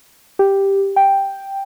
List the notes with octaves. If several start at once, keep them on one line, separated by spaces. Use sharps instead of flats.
G4
G5